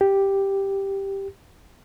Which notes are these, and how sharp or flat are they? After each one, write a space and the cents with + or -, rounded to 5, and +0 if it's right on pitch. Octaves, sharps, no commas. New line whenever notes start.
G4 +0